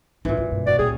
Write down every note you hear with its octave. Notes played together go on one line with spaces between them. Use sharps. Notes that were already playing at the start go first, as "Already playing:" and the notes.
G2 A#2 E3 D#4
F#2 F4
G2 B2
F#2 B2 F#4 D5 F5
C#2 A#2 G3 C#4 G#4